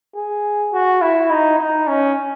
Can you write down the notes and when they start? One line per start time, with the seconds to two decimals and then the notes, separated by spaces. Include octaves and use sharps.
0.16 G#4
0.72 F#4
1.01 E4
1.30 D#4
1.58 D#4
1.87 C#4